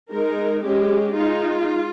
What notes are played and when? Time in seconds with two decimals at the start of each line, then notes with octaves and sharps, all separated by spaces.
0.12 G#3 D#4 A#4
0.63 G#3 C#4 G4
1.15 G#3 D#4 F4